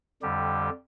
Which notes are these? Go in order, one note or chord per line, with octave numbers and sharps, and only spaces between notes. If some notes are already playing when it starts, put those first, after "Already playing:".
F2 D3 G3 G4